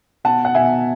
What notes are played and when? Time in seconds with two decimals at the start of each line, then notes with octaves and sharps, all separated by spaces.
0.24 B2 F#5 A5
0.45 F#5
0.55 B2 E5 G#5